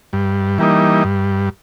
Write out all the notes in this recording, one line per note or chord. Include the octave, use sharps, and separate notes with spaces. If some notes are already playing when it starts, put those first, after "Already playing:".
G2
E3 G3 A#3 D#4
G2